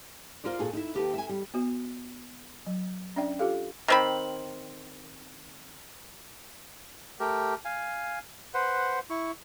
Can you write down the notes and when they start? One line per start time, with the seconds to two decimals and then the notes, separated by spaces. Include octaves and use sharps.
0.44 F4 A#4 C5 D5
0.59 A#2 F4 F#4 G#4 A4
0.73 D#4 E4 E5
0.95 D#2 G4 A4 B4
1.14 E5 G#5
1.29 G3
1.54 B3 F#4
2.67 F#3
3.16 C#4 D4 D5 E5 G5
3.39 F4 G4 A4 F5
3.88 D#3 C4 B5
7.20 A3 G4 A#4
7.65 F5 G#5
8.54 B4 C5 F#5
9.10 E4 C#6